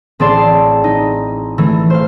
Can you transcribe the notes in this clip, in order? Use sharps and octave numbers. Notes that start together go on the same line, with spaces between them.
A1 C4 G#4 D5 A5 C6
D#4
E3 A3
C5 F5